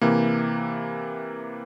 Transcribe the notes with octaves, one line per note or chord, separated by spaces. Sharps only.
C3 E3 A#3